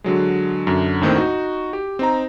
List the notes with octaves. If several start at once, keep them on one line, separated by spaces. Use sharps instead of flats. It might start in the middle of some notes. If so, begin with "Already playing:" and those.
D3 F#3 G#3
F#2 D3
D#2 A2 D#3 A3 C4 D4
D#4 F#4
G4
C4 D#4 A#5